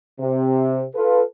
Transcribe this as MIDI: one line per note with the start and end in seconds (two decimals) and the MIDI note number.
0.20 0.84 48
0.95 1.21 65
0.95 1.21 69
0.95 1.21 71